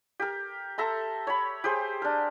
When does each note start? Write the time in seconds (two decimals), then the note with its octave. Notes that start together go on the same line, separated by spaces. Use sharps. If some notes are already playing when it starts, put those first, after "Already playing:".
0.20 G4 A#4
0.78 A4 E5 A#5 C6
1.27 C#5 B5
1.64 G4 G#4 C5
2.02 D4 A#4